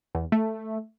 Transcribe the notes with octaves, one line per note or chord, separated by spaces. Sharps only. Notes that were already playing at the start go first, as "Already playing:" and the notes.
E2
A3